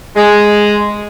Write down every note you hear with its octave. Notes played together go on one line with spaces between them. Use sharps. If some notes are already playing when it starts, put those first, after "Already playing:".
G#3